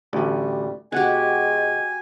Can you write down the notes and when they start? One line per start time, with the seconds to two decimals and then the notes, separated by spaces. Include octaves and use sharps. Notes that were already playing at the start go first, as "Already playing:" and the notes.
0.13 A1 D2 G3
0.92 B2 G#3 F#4 G4 F#5 G#5